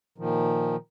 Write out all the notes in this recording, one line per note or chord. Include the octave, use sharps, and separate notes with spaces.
A#2 D#3 F3